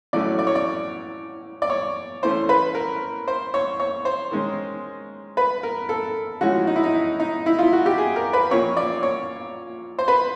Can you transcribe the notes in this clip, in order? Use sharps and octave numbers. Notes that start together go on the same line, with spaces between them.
A2 F#3 A3 C#4 D5
D5
C#5
D5
D5
C#5
E3 A3 C#4 C5
B4
A#4
C5
C#5
C#5
C5
D#3 G#3 C#4
B4
A#4
A4
A2 F3 G#3 C#4 F#4
D#4
E4
D#4
D#4
E4
F4
F#4
G4
G#4
A#4
B4
A#2 F3 A#3 C#4 C#5
D5
C#5
C5
B4